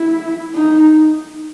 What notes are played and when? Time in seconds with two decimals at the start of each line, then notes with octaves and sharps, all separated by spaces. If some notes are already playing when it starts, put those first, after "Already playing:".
Already playing: E4
0.54 D#4